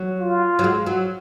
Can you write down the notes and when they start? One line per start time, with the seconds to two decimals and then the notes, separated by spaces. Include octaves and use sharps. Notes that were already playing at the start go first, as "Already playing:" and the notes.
Already playing: F#3
0.20 F4
0.59 F#3
0.64 G#3
0.86 F#3